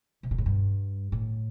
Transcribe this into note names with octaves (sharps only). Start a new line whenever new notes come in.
C3
A#2
A2
G2
A2